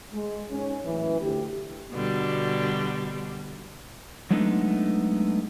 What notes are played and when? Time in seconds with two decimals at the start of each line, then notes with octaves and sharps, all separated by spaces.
0.13 G#3
0.50 G#1 C#4
0.85 F#2 A2 E3
1.20 D2 E4 G4
1.91 B2 D3 G3
4.30 F#3 G#3 A3 B3 D4 D#4